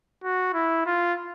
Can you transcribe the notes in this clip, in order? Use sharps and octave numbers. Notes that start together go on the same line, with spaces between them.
F#4
E4
F4